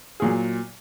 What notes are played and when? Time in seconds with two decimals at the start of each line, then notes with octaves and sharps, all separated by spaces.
0.20 A#2 F#3 G#4